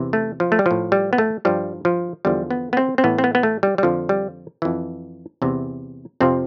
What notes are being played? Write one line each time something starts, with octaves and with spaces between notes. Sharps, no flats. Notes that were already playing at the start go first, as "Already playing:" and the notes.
Already playing: E2 C3 E3
A3
F3
A3
G3
A2 F3
G3
B3
A3
G2 F3 G3
F3
E2 D3 F3 G3
B3
B3
C4
C4
A2 E3 B3
C4
B3
B3
A3
G3
G3
F2 D3 F3
G3
F2 E3
E2 C3 E3
F2 C3 F3 C4